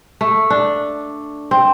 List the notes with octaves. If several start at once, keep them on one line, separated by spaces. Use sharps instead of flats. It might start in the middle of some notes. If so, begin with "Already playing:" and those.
A3
D4
C4